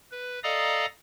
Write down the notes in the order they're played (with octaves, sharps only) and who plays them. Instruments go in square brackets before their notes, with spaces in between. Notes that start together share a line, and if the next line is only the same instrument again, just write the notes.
[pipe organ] B4
A4 D5 D#5 F5 A#5 D#6